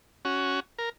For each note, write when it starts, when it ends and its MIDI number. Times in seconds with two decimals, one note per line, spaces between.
0.25 0.60 61
0.25 0.60 66
0.78 0.89 70